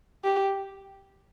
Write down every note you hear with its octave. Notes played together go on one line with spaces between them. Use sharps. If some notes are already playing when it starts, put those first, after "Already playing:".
G4